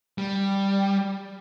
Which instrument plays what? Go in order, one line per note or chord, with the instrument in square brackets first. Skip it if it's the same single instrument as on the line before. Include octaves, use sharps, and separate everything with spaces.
[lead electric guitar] G3